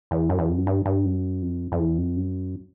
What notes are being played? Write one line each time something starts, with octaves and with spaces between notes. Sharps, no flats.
E2
F#2
E2
F2
F#2
G2
G2
F#2
F2
F2
E2
F2
F#2